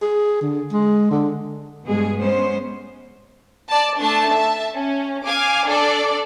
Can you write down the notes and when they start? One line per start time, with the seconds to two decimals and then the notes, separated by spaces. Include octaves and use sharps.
0.02 G#4
0.42 D3
0.73 G#3
1.11 D3
1.86 G2 B2 G#3 G#4
2.20 G#3 B3 C#4 C5
3.69 D5 A5
3.99 A3 D4 A5
4.34 E5 A5
4.75 C#4
5.25 F5 G#5 D6
5.68 D4 A4 D5